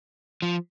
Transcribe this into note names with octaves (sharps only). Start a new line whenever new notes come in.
F3